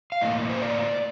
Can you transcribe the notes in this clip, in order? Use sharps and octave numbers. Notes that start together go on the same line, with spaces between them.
F5
A2 G3 A#3 D#5
C5
D5